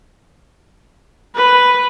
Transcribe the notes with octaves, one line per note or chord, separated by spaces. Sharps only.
B4